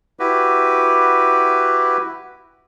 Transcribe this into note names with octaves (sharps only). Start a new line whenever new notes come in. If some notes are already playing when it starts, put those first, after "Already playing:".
E4 F#4 G4 B4